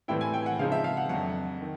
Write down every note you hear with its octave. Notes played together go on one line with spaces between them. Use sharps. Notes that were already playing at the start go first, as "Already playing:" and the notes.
A2 E3 G3 C4 E4 G5
G#5
G5
F#5
C#3 F3 G#3 C4 D#4 F5
E5
F5
F#5
F2 D3 F#3 F#5
D#3